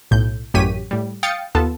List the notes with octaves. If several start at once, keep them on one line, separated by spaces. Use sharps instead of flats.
B1 A2 G6
A1 F#2 G4 C#5 B6 D#7
A2 G3
F5 G5 D#6 A6 C#7
D#2 B3 F4 A4 A5